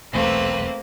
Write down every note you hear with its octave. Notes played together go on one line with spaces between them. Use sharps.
D#1 B1 E2 A3 A#3 C4 B4